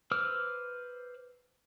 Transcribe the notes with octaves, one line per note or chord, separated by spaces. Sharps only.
B4 C5 D6 E6 F6